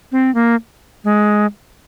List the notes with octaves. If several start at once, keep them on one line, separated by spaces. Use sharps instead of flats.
C4
A#3
G#3